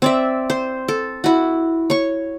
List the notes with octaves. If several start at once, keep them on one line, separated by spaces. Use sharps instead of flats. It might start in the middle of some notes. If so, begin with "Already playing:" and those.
C4 D5 E5
C5
A4
E4 F#4
C#5 C#6